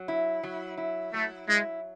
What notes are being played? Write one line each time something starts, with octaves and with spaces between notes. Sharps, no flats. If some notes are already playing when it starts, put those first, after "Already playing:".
Already playing: F#3
E4
F#3
E4
F#3 A3
G#3 E4